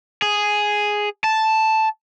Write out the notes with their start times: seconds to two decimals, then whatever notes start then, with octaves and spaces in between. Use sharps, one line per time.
0.22 G#4
1.24 A5